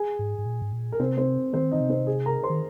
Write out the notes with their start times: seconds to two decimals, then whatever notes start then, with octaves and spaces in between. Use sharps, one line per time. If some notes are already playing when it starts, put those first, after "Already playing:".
Already playing: G#4 G#5
0.19 G#2
0.38 G#2
0.46 A#2
0.62 G#2
0.72 A#2
0.92 A#4
1.00 C3 C4 C5
1.17 C4 C5
1.53 D#3 C4 C5
1.71 D#3 D#4 D#5
1.81 C3
1.89 C4 C5
2.07 G#4
2.26 A#4 A#5
2.43 C5 C6
2.50 D#3